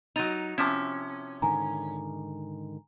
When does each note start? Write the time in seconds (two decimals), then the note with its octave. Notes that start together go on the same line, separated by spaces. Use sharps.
0.16 F#3 D#4 A6 D#7 F7
0.58 C3 F3 C#4 E4
1.42 G#2 D3 D#3 G#5 A#5